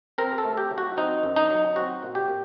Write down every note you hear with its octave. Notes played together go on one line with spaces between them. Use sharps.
C4 A#4
A4
A3
G4
F#3
F#4
C4 D#4
F#2
D#4
F#3
C4 F#4
A#2
G4
A#2